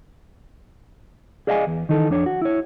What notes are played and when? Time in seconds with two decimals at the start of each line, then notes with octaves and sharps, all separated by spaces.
1.47 G#4 D5 D#5 F5 F#5 G#5
1.67 E2
1.89 D#3 E3 D#4 A4
2.10 F2 D4 C#5
2.26 F#4
2.42 E4 C#5